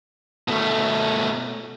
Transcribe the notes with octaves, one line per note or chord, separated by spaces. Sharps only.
B2 A3